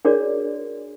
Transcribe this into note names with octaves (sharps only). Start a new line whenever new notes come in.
D4 F#4 G#4 A#4 C#5 D5